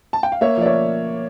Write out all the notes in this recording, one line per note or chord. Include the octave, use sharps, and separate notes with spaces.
A5
G5
F5
A#3 C#5 E5
F3 D5
C#5 E5